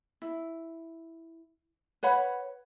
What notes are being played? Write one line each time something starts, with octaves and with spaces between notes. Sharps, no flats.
E4
B4 C#5 F#5 B5